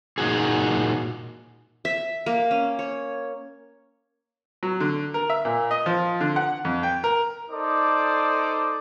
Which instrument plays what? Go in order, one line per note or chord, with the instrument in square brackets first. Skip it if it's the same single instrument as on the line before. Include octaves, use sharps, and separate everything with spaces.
[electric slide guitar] A#2 D#4 F#4 G#4
[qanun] E5
A#3
C#4
C#5
[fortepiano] F#3
D3
A#4
E5
A#2
D#5
F3
D3
F#5
F2
G5
A#4
[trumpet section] D#4 A4 C5 D5 D6 D#6